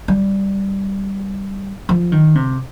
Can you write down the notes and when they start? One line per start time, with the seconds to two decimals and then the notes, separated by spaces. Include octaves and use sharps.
0.08 G3
1.89 F3
2.12 D#3
2.35 C3